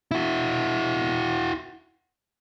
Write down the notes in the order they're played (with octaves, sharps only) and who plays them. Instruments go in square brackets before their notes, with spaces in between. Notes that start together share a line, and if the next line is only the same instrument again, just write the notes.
[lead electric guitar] E4 F#4